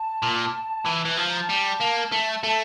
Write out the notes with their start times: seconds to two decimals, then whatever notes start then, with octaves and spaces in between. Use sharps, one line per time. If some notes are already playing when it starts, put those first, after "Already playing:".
Already playing: A5
0.22 A#2
0.85 E3
1.05 E3
1.17 F3 A5
1.29 A#5
1.40 A5
1.49 G3
1.80 A#3
2.12 A3
2.43 A3